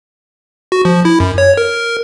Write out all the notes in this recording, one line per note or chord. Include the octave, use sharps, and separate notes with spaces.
F#4
F3
E4
F#2
C#5
A#4